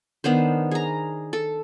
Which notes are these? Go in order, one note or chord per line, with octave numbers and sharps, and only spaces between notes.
D#3 B3 D4 C5
G#4 A#5
A4